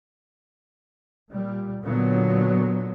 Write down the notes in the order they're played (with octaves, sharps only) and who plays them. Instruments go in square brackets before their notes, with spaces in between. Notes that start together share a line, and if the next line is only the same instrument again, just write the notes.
[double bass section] A#2 G3
A#2 D3 F#3 B3